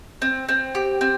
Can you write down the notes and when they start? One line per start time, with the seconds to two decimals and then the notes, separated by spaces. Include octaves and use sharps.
0.22 C4
0.49 C4
0.75 G4
1.01 C4